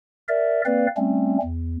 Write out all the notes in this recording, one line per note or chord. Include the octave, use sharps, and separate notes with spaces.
A#4 D5 E5
A#3 C4 B4 D5 F5
G3 A3 C4 C#4
E2